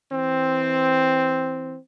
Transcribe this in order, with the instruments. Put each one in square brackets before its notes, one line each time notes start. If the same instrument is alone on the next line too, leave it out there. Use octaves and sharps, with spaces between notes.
[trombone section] E3 C4